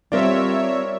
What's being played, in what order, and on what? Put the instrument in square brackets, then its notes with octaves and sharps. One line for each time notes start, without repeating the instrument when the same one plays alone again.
[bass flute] G3 [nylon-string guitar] C4 D4 F4 [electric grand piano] A#4 D5 [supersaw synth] C#5 E5